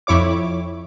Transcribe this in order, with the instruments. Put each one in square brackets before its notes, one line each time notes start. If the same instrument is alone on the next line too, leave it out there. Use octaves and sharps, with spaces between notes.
[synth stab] F2 E4 C#5 D6